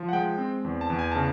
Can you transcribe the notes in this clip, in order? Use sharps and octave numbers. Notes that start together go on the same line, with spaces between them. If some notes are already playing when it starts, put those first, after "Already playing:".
Already playing: F3
F#5
G#3 G5
C4
E2
A5
E2
G#5
C#3 A5